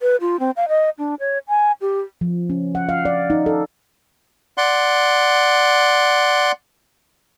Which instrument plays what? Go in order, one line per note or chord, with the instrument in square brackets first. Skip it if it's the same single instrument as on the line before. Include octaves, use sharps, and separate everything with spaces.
[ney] B4
F4
C4
F5
D#5
D4
C#5
G#5
G4
[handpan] F3
C#4
F#5
F5
D5
D#4
A4
[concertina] D5 F#5 C6